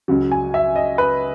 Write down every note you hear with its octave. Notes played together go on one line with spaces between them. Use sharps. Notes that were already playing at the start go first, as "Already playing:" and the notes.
C#2 C#3 F#3
G#5
E5
D#5
B4